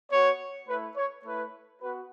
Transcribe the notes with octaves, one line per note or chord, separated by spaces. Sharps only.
B3 F#4 C#5
A3 E4 B4
C#5
A3 E4 B4
B3 F#4 B4